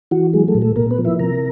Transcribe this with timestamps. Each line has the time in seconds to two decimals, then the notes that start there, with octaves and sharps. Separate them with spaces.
0.11 E3 F#4
0.33 F#3 G#3 G#4
0.48 A3 A4
0.55 A#2
0.62 A3 A4
0.76 A#2 A#3 A#4
0.91 B3 B4
0.98 F3
1.05 E4 E5
1.19 C3 A#4 A#5